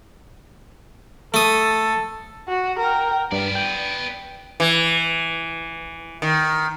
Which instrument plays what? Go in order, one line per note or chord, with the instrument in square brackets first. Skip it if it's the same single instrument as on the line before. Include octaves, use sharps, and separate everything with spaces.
[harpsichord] A3 D#6 [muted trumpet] A4
[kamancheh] F#4
A#4 G5
[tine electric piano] G2 [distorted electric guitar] B3 D5
[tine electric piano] G5
[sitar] E3
D#3